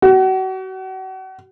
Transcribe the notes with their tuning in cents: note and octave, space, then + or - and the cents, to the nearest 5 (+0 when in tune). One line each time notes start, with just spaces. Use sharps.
F#4 +35